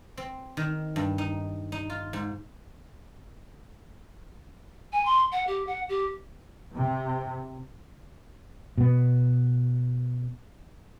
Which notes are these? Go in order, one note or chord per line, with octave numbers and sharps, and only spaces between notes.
C4
D#3
G2
D#4
D#4
F4
G#2
G#5
C6
F#5
G4
F#5
G4
C3
B2 B3